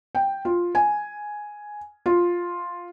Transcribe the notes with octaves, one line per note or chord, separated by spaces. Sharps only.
G5
F4
G#5
F4